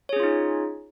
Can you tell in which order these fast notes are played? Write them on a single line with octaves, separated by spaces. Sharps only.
C#5 G#4 C#4 F4 D#4